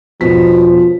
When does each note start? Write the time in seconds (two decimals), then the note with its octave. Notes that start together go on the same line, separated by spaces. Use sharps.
0.21 E1 B2 F3 B6